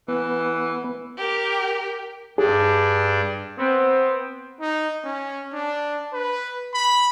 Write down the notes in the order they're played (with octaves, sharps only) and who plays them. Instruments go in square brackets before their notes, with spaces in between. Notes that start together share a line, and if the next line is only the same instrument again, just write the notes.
[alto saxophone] E3 [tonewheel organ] B3
[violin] G4 A#4
[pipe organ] G2 D4 [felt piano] G#4
[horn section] B3 C4
[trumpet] D#4
C#4
D4
B4
B5